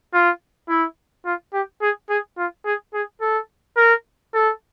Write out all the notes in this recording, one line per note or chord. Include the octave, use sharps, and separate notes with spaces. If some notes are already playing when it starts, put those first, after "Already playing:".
F4
E4
F4
G4
G#4
G#4
F4
G#4
G#4
A4
A#4
A4